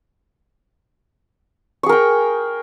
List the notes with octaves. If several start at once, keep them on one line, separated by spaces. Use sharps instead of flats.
G#4 A#4 G5 C#6